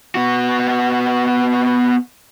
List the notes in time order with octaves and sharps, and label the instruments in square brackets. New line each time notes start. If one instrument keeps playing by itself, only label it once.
[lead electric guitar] B3 F#4